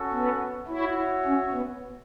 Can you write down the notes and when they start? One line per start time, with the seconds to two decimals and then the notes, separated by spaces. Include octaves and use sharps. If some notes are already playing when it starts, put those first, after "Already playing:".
Already playing: C#4 F#4 A4
0.12 B3
0.68 E4 F#4 C#5 E5
1.25 C#4
1.53 B3